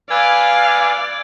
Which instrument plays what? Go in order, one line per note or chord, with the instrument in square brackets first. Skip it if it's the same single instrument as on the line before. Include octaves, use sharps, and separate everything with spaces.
[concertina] B4 G#5 [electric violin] D5 [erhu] F5 [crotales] D6 E6 G#6